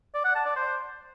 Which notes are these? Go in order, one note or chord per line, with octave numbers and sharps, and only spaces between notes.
D5
F#5
A5
D5
C5